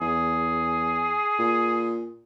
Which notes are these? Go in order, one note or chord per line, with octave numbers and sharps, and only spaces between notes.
E2 G#4
A#2